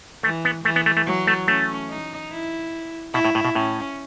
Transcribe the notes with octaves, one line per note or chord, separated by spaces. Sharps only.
E3 A3
B3
E3 A3
B3
A3
A3
F#3
A3
A3 C#4
D#4
E4
B2 E4
A2
A2
B2
A2 C#4